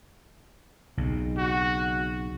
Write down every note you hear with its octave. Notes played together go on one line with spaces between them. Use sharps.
B1 C#3
F#4